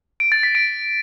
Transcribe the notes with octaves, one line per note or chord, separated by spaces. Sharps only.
D7
A6
B6
D7